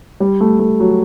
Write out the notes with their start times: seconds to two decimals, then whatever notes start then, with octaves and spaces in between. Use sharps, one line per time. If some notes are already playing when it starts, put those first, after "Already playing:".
0.20 G3
0.40 A3
0.59 A3
0.80 F#3